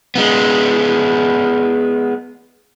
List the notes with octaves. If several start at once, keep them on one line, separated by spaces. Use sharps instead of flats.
G#3 B3